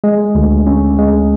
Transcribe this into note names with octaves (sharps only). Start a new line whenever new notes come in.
G#3
D2
C#4
G#3